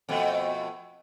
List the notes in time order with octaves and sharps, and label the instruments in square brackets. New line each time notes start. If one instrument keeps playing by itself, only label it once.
[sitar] F2 B2 A3